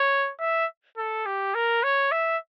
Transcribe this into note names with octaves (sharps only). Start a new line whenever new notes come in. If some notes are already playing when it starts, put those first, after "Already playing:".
Already playing: C#5
E5
A4
G4
A#4
C#5
E5